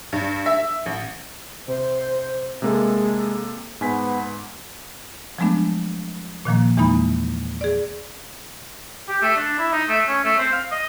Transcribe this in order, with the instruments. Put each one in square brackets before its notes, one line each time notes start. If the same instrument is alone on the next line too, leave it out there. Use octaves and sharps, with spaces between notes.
[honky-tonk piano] G2
E5
A1
[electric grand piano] C3 [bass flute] C5
[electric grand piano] C3 A#3 A4 [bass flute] G#3
[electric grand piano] G#2 G#5 B6 [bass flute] B3
[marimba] F3 F#3 G#3 A3 B3 D4
A#2 D#3 F3 A#3
E2 E3 G#3 A#3 D#4 B5
G#4 D5
[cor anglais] G4
A3
D4
E4
D#4
A3
C#4
A3
C4
F5
D#5